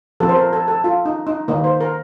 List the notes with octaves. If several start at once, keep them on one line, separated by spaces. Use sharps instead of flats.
F3 C4 A4
C5
A#4
A4
A4
F4
D#4
D#4
D#3 A#3 D#4
C5
A#4